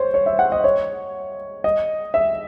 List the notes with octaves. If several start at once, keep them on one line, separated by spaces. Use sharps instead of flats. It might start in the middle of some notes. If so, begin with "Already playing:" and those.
Already playing: C5 C#5
C#5
E5
F#5
D#5
C#5
D#5
E5